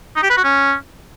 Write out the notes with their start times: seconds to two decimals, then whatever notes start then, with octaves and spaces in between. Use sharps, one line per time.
0.16 D#4
0.23 G4
0.30 B4
0.37 F#4
0.44 C#4